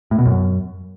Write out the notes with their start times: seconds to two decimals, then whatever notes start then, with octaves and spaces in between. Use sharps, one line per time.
0.11 A2
0.18 B2
0.26 F#2